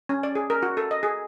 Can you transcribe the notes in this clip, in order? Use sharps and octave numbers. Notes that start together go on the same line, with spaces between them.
C#4
D5
G#4
A#4
F#4
A4
D#5
G#4